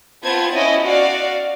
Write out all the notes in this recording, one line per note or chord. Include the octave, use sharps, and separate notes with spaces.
B3 C4 F4 C5 A5 G#6
C#4 E4 D#5
F#4 D5 F5